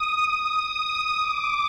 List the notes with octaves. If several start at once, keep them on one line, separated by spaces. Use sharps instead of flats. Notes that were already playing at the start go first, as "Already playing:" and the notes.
Already playing: D#6
D#6
D6